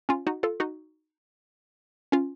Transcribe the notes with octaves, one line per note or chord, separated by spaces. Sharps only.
C#4 F4
D#4 F#4
F4 A4
D#4 F#4
C#4 F4